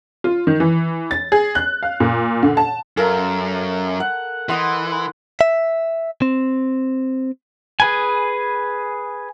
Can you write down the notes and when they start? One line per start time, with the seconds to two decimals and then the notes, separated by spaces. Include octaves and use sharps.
0.24 F4
0.47 D#3
0.60 E3
1.11 A6
1.32 G#4
1.55 F#6
1.83 F5
2.00 A#2
2.43 D3
2.57 A5
2.97 F#2 A4 A#4 F5
4.00 F#5
4.49 E3 D#5 F#5 C6
5.41 E5
6.22 C4
7.80 G#4 B4 G#5